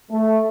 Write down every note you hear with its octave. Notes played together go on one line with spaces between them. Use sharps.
A3